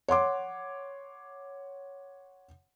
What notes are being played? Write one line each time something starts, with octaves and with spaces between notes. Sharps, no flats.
C#5 F#5 C6 D6